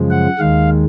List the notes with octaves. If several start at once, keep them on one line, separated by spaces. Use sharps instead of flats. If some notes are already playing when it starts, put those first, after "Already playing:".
Already playing: F#2 C#3 F3 G#3
F#5
D#2 D#3 G#3 F5